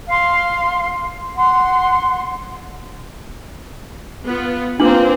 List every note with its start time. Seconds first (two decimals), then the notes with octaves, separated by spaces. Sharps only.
0.08 F5 C6
1.37 F#5 C6
4.25 B3 F4
4.80 A#3 C4 D4 F4 B4 D6 F#7